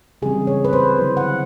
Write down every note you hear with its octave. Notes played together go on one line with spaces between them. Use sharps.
C#3 E3 G3 C4 G#4
C#5
B4
C5
D3 F#3 B3 E4
F#5